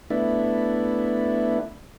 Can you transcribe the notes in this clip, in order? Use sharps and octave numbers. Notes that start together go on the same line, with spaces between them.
A3 B3 D4 E4